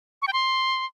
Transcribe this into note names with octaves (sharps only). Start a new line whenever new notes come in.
C#6
G5
C6